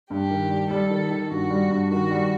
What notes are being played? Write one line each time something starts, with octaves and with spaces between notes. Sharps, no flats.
G2 G4
D#3
G3
G3 A4
D#3
D#3
G2 F#4
G3
G2
D#3 F#4
G3